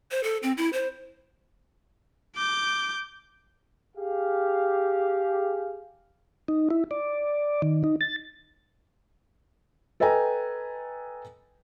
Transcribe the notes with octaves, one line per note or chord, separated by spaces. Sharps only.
C5
A4
C4
E4
C5
D6 G6
G4 G#4 F5
D#4
E4
D5
D#3
D#4
A6
A4 B4 D#5 G5 G#5 A#5